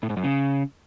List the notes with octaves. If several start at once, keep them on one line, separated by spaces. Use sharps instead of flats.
A2
G#2
F#2
C#3